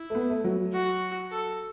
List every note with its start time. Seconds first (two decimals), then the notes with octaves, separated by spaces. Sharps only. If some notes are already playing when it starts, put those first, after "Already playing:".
Already playing: E4
0.10 A3
0.15 B3
0.30 A3
0.44 F#3
0.72 F#4
1.31 A4